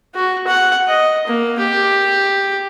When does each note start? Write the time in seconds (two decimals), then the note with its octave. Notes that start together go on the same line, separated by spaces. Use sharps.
0.15 F#4
0.47 F#5
0.88 D#5
1.27 A#3
1.58 G4